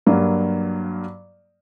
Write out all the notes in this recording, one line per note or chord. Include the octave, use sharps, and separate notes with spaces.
G2 F#3 A#3